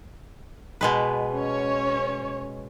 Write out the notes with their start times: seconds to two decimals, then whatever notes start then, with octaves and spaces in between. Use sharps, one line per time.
0.81 B2 G#3 B4
1.33 C#4 C#5